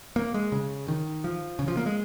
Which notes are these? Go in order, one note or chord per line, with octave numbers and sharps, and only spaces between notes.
A#3
G#3
C#3
D#3
F3
C#3
F3
A#3
G#3